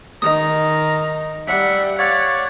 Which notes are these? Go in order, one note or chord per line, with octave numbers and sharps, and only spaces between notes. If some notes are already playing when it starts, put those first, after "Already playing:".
D#3 D#5 A#5 D#6
G3 E5 F#5
C#5 D5 F5 F#5